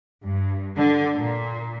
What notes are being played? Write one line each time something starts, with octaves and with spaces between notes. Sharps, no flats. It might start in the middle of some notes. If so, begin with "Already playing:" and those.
G2
D3
A#2